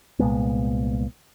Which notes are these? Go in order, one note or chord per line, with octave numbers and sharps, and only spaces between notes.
C2 A#2 G#3 B3